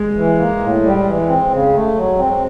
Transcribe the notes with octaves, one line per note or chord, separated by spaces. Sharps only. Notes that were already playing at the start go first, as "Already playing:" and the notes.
Already playing: G#3
E3
A#3
A2
G3
E3
C4
C#3
A3
F#3
C4